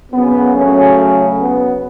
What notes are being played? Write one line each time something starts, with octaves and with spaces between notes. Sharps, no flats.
F#2 C#3 F#3 B3
A3 C#4
B3